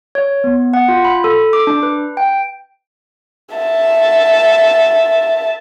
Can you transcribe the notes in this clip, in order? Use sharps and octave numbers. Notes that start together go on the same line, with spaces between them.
C#5
B3
F#5
F4
B5
A4
D6
D4
B4
G5
E5 A5